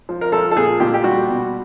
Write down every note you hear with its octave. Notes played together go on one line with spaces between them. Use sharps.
F3
A#4
F3 A4
A4
A#2 G#4
A#2 G4
G4
G3 F#4
B2